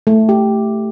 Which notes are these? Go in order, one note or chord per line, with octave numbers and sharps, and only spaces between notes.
A3
G4